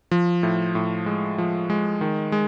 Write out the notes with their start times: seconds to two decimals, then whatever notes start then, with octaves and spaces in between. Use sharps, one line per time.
0.11 F3
0.43 A2
0.75 A2
1.06 G#3
1.38 F3
1.70 G#3
2.01 D#3
2.32 G#3